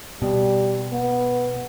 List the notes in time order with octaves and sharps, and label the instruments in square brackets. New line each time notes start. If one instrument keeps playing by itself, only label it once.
[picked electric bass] B2 [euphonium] G3
[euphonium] B3